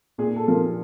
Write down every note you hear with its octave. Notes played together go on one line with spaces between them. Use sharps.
A#2 G#4
A4
F3 A#4